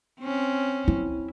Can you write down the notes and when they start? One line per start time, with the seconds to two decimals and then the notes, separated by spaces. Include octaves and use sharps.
0.21 C4 C#4
0.88 E4